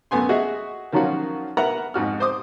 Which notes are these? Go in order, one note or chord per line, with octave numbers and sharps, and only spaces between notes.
F#2 A3 B3 G#5 C6
F#4 G#4 D#5 E5
D#3 F3 F#3 C#4 F4 F#4
A#4 B4 E5 F#5 A#5
F2 G#2 F#4 F6
C5 C6 D6 D#6